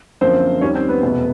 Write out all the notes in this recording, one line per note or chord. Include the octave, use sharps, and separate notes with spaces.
F#2 D3 F3 A#3 C4 C5
D#2 D#3 G3 C#4 C#5
C4 C5
B3 B4
F1 E2 B2